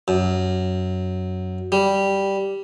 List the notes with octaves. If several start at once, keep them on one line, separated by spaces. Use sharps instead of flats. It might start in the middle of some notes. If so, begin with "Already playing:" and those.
F#2
G3